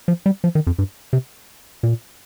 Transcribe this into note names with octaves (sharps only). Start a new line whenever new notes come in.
F3
G3
F3
D#3
F2
G2
C3
A#2